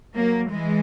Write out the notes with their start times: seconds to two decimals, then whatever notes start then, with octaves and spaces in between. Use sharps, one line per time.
0.15 F#3 A#3
0.50 E3 G#3